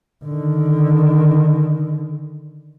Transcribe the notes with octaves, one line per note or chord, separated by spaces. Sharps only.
D3 D#3